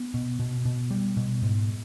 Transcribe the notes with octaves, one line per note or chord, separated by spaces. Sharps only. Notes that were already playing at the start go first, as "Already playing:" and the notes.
Already playing: B3
B2
B2
B2
G3
B2
G#2